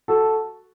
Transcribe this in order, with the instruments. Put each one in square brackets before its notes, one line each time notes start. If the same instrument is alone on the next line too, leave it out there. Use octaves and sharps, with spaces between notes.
[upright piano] F#4 A4